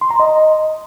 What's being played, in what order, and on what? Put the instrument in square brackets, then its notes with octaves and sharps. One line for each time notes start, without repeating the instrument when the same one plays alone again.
[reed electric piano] C6
A#5
D#5